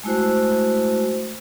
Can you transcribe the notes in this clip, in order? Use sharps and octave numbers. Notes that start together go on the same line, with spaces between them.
G#3 A3 E4 F#4 C5